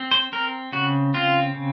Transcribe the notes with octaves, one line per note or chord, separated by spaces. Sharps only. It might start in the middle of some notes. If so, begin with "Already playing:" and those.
Already playing: C4
C5
C4 A#4
C#3 F#4
C4 F4
C#3